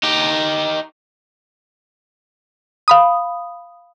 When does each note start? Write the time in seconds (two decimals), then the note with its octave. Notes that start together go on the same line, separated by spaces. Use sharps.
0.03 D#4 G4
2.88 F5 B5 D#6